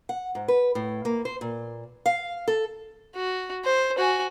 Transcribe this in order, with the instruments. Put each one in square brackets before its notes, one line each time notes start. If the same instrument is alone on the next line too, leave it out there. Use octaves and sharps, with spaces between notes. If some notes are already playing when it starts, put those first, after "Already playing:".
[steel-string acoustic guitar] F#5
G#2
B4
A2
A#3
C5
A#2
F5
A4
[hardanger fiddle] F#4
C5
F#4 G#5